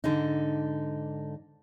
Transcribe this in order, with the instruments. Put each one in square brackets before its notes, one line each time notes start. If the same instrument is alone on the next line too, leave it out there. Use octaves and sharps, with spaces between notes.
[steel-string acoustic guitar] G#2 D3 D4 D#4